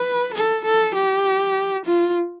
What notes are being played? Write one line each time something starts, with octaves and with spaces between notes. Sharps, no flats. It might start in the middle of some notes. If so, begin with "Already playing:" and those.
Already playing: B4
A4
A4
G4
F4